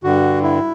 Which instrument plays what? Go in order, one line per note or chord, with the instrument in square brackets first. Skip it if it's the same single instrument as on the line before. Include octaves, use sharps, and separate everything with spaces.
[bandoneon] G2 D3 F#4
E4